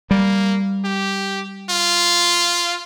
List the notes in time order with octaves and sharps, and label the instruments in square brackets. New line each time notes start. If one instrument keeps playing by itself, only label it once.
[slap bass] G3 [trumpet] A#3
[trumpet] G4
F4